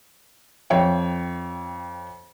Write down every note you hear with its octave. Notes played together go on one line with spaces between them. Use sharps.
F2 C#5 G5